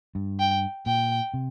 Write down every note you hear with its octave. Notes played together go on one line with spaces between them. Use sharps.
G2
G5
A#2 G5
C3